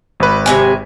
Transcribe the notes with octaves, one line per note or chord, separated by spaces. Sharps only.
G#1 B4
C3 C#4 G#5